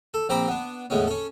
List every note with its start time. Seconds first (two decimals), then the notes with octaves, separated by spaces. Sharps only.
0.14 A4
0.29 A#1 C4 C5 A#5 B5 D6
0.48 B3 D4
0.90 E2 A2 G#3 B3 C#4
1.07 C#4 A4